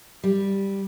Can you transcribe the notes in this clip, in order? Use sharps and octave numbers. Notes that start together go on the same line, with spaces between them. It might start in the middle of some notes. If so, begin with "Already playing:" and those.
G3